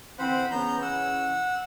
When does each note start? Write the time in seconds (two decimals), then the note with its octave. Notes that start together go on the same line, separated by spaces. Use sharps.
0.19 D3 E3 C4 C5 F#5 B5
0.51 C#3 E3 B3 C#4 A#5 G6
0.82 F#5 E6